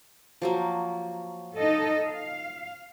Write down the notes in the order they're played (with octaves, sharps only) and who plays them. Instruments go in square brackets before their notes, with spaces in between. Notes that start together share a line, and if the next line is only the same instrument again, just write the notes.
[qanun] F3 F#3 A#3
[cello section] D#4 A4 D#5
F5